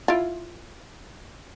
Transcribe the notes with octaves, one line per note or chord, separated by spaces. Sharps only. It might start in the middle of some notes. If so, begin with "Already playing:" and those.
E4 F4